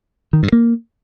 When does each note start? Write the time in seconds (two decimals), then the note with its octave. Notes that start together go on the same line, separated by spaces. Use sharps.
0.33 D#3
0.43 G2
0.52 A#3